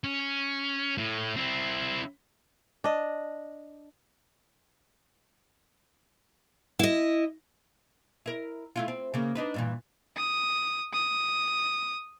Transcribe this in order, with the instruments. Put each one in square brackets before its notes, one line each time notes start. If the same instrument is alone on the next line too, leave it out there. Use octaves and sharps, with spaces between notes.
[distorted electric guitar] C#4
A2
C4 E4
[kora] D4 D#5
[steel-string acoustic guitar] E4 D#5
[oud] E4 A#4
A3 E4 F4
C4
C#3 A#3
D4 D#4 B4
G2 A#2 E3
[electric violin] D#6
D#6